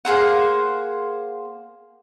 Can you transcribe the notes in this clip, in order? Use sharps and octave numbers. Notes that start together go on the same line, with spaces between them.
A#3 G#4 C5 F#5